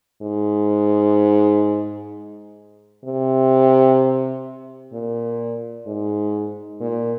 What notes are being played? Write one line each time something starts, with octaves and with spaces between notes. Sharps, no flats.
G#2
C3
A#2
G#2
A#2